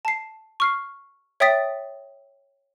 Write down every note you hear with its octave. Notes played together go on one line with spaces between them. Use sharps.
A5 C7
C#6 F6 C7
C#5 E5 G5 D#6 A6 B6